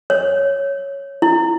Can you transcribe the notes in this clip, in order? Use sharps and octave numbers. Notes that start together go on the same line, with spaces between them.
C#5
E4